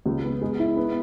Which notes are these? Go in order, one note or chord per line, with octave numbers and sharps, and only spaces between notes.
C#2
B3
G#3
E4
B3